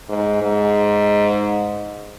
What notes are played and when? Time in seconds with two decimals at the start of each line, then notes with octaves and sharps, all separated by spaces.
0.09 G#2
0.42 G#2